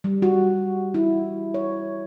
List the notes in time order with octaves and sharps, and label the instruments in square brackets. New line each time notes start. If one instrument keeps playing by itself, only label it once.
[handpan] G3
F#4
E4
C#5